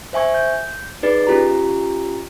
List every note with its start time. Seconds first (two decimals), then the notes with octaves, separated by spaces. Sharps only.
0.13 C5 E5 G#5 C#6 G#6
0.34 G6
1.03 D#4 G#4 B4 D5 A6
1.27 C#4 F4 G4 A#5